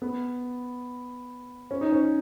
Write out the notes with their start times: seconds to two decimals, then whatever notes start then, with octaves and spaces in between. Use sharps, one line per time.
0.02 B3
1.71 C#4
1.81 D#4
1.92 C#4